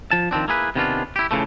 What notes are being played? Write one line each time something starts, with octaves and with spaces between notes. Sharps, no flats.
F3 A5
D#3 F3 C4 D4
A#3 E4 G#4 B4
C3 D#3 B3 C#4 D4 F4
E4 G4
A2 C#3 E3 F3 A3